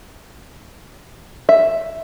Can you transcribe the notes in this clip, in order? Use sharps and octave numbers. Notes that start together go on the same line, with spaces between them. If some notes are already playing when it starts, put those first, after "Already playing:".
E5